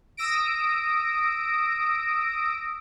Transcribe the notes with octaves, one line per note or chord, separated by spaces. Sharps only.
D#6 E6 A#6 D7